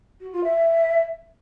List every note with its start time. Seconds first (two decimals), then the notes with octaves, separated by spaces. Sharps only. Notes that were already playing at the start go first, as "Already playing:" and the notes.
0.20 F#4
0.32 F4
0.44 E5